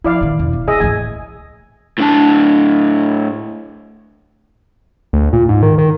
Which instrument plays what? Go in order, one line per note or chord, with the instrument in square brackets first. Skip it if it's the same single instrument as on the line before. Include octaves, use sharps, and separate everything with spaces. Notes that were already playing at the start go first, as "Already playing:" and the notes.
[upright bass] F3 [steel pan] E4 D5 F5
[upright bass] A#2 D#3
E1
B3
[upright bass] A#3 [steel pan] G#4 D#5 E5
[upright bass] A1 D2 [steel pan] G#5
[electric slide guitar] A2 D4 A5
[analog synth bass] D2
A#2
G#2
D#3
D#3